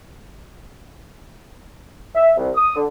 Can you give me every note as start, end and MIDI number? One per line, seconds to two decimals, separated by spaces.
2.15 2.31 76
2.37 2.49 36
2.55 2.74 87
2.75 2.84 50